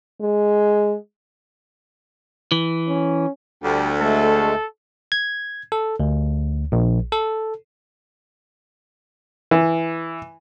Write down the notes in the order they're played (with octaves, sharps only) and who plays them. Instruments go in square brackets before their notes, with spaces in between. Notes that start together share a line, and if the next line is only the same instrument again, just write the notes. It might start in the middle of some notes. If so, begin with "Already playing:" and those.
[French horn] G#3
[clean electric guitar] E3
[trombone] C#4
[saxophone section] D2 [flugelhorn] G3
[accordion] G#3 A3 [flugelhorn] A4
[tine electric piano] G#6
A4
D2
A#1
A4
[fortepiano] E3